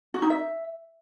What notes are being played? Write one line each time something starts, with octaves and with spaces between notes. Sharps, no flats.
F#4
D#4
E5